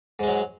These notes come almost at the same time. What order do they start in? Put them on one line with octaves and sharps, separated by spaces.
G#2 G#3 F#3